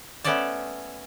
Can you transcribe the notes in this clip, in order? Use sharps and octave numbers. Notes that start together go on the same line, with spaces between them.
A3 B3 C#4 A4 D5 A5